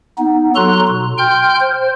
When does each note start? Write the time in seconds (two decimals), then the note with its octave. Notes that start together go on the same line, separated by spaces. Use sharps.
0.18 B3 D#4
0.56 F#3 F#4 A4 A#5 C6 F#6
0.88 B2
1.18 G5 C6 F6 G6
1.60 C5